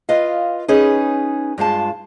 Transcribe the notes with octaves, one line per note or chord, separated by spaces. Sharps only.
F4 B4 D#5 F5
C#4 D#4 G#4 B4
G2 G#3 F4 A5